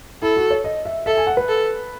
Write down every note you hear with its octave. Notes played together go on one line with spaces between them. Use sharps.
E4 A4
F#4
C#5
D#5
E5
A4 E5
G#5
F#5
B4
A4